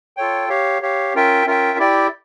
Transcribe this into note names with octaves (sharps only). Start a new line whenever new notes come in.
F4 A4 C#5 G5
G4 C#5 F5
G4 C#5 F5
C#4 F4 A#4 E5 G5
C#4 F4 A#4 E5 G5
E4 G4 D5 G5